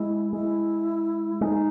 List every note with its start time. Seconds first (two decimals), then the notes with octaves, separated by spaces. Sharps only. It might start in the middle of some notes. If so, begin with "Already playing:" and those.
Already playing: G#3 E4
0.33 G#3 E4
1.41 G#3 D#4